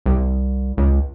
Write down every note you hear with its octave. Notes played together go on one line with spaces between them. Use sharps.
C2
C#2